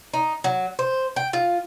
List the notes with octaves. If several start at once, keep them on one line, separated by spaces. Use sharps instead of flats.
D#4
F#3
C5
G5
F4